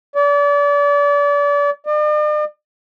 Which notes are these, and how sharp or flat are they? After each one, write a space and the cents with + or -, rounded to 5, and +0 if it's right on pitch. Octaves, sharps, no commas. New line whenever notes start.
D5 -35
D5 +45